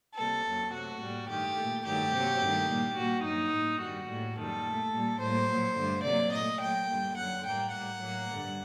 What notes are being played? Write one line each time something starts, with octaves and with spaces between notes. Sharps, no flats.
C3 G3 A#3 A4
F#2 F#3 A#3
C3 F#3 A3 F#4
A2 G3 A#3
G2 D#3 A3 G4
A3
A#2
G2 D#3 F#3 A3 G4
C3 F#3 A#3
G2 D#3 A3
A#2 G3 A#3
A#2 G3 A#3 F#4
G2 F#3 A#3 D#4
A2 G3 A#3
G2 D#3 G3 F#4
A2 G3 A#3
F#2 D#3 G3 A#3 A4
A#2 A3
A#2 G3 A#3
A2 G3 A#3 C5
A#2 F#3 A#3
G2 D3 A3
C3 F#3 A#3 D5
A#2 A3 D#5
A#2 F#3 A3 G5
G2 D3 G3 A#3
F#2 D3 F#3 F#5
A2 G3 A#3 G5
A2 G3 A#3 F#5
A2 F#3 A#3
G2 D3 G3